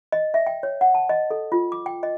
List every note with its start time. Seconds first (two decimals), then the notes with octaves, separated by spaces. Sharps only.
0.12 D#5
0.34 E5
0.47 G5
0.63 C#5
0.81 F#5
0.94 A5
1.09 D#5
1.31 A4
1.52 F4
1.72 D6
1.86 G5
2.03 D#5